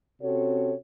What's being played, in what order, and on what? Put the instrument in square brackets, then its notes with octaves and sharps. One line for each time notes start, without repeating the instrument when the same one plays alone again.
[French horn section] C3 C4 C#4 F#4 A4 C#5